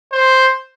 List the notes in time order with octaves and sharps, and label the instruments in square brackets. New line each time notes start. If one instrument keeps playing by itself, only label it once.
[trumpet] C5